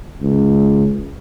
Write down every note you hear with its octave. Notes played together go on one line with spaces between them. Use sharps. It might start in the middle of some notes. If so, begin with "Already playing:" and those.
C#2